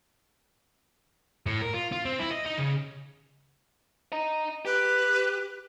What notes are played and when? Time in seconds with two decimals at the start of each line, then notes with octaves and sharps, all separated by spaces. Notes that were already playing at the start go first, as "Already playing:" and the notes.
1.46 A2
1.62 A#4
1.74 F4
1.92 F4
2.05 C4
2.20 E4
2.32 D#5
2.46 D#4
2.58 C#3
4.12 D#5 A#5
4.65 G4 B4